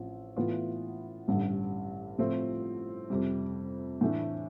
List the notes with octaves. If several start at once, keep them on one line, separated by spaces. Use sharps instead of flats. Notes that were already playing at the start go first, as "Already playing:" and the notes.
Already playing: A1 F3 C4
A2 E3 B3 F4
A1 G2 D3
A2 F3 A3 C4 F4
F2 C3 G3
A2 E3 A3 D4